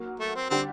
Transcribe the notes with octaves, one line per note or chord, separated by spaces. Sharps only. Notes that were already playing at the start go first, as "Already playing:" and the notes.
Already playing: F#3 A#3 F#4
A3
C4
D3 G3 C4 D4 G4